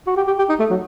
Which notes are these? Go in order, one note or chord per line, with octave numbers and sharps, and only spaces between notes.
F#4
G4
G4
G4
D#4
A3
F#3